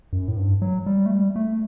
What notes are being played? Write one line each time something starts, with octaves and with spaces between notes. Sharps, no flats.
F#2
A2
G2
F#3
G3
A3
G3
A3